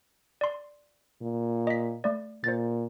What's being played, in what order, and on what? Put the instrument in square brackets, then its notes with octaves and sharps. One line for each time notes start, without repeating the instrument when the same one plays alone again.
[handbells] D5 C6
[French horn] A#2
[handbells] D#5 B6
A3 D5
[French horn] A#2 [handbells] C5 A6